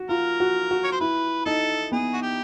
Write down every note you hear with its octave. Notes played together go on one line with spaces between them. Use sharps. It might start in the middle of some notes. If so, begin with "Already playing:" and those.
Already playing: F#4
F4 A#4
F#4
F#4
C#5
C5
E4 B4
D#4 A4
B3 G#4
F#4
G4